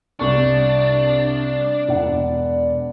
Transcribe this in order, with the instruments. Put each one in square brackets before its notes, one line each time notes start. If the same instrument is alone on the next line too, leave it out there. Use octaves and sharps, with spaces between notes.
[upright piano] C2 C#6 [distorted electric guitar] D4 [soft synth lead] D5
[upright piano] E1 F#5